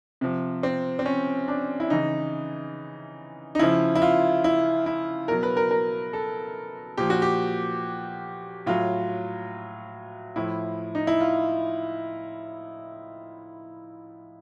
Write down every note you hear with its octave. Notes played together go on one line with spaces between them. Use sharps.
C3 F3
C4
C4
C#4
D4
E4
C#3 E3 D#4
D#4
C#3 F3 E4
E4
F4
E4
E4
B2 F#3 A#4
B4
A#4
A#4
A4
A#2 F3 G4
F#4
G4
A2 F#3 F4
A2 F3 E4
D#4
E4
F4